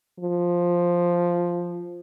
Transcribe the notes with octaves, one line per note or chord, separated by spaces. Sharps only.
F3